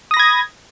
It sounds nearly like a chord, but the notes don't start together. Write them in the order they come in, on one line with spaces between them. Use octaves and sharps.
D#6 A#6 B5 G#6